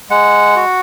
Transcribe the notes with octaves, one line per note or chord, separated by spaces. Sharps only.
G#3 F#5
F#4